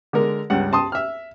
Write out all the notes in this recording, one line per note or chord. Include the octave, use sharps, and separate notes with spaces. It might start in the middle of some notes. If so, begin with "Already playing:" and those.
D3 G#3 A#4
C#2 G2 F#5
A5 C6 D#6
E5 F6